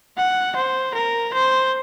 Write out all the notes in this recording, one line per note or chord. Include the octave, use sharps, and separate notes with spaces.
F#5
C5
A#4
C5